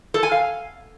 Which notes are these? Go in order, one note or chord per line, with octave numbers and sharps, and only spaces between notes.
A4
G#5
F5